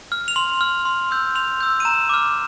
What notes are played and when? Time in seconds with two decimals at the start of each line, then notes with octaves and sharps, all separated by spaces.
0.12 F6
0.28 F7
0.36 C6 F#7
0.61 F6
0.85 C6
1.11 E6 G6
1.35 C6 F7
1.61 E6 G6
1.80 D#7
1.85 A#5 E7
2.09 D6 F6